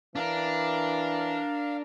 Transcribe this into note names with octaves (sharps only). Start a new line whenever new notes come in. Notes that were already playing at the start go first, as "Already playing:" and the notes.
E3 D4 A#4 F5